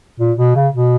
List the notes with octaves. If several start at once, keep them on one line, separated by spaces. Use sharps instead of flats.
A#2
B2
C#3
B2